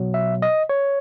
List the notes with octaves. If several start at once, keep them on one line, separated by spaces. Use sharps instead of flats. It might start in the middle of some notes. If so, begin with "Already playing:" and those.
Already playing: B2 F#3 B3
E5
D#5
C#5